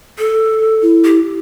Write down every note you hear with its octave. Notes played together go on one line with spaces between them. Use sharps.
A4
E4
G4